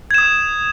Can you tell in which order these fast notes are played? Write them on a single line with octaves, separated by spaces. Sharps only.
G#6 E7 D#6